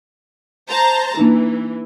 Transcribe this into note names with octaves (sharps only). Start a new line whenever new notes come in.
C5 A5 A#5
E3 A#3 D4 D#4